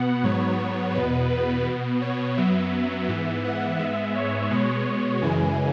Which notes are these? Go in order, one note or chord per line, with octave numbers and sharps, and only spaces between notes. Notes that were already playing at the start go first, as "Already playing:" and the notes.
Already playing: B2 B3 F#5
G#2 F#3 B3 C#5
C#5
E2 B2 B3 B4
B4
B2 B3
C#5
F#2 F#3 B3 E5
G#2 E3 B3
F#5
G#2 G#3 B3 E5
C#5
B2 G#3 B3
F#2 C#3 E3 G#3 G#5